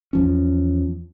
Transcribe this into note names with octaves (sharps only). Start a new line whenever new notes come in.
E2 F3 C#4